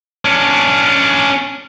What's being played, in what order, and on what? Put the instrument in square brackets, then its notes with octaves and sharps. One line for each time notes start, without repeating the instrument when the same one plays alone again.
[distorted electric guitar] C#4 D4